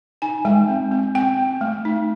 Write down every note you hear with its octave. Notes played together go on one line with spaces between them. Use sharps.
D#4 G#5
G#3 G5
C4
C4
C4 G5
C4
A3
D#4